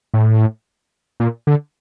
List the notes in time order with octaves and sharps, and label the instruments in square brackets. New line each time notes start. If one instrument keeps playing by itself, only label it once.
[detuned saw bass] A2
A#2
D3